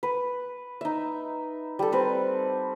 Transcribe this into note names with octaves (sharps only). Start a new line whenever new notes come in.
B4
D#4 E5
G3 A4
G3 C4 B4